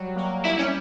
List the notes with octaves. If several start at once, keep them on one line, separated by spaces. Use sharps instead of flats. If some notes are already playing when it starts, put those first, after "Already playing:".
Already playing: F#3 G3
A#3
G3 E4
C#4